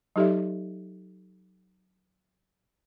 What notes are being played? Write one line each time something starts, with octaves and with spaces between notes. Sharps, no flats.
F#3 D#4 G4 A4 D5 E5